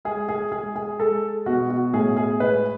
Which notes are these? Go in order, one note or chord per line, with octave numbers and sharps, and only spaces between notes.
G#3 G#4
G#4
G#3 G#4
G#4
G#3 A4
B2 F#4
F#4
A2 G#4
G#4
G#3 B4